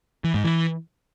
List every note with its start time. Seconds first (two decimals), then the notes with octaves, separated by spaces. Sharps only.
0.24 E3
0.34 G#2
0.44 E3